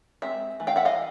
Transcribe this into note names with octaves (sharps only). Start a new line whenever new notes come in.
G#3 C4 E5
E3 A3
F5 G5
E5 F#5
D#5 F5
E3